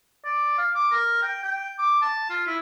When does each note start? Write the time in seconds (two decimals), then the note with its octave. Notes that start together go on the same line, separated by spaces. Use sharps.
0.25 D5
0.58 F5
0.75 D6
0.91 A#4
1.22 G5
1.44 G5
1.78 D6
2.01 A5
2.30 F4
2.47 E4